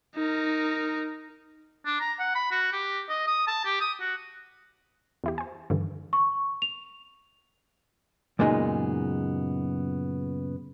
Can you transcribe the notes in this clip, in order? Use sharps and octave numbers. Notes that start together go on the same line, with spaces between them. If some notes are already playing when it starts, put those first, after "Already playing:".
D#4 A#4
D4
A#5
F#5
B5
F#4
G4
D#5
D#6
A5
G4
D#6
F#4
E2 E4 G4
C5 G#5
G2 D3 E3
C#6
F7
F#2 A#2 C#3 G#3 B3 D#4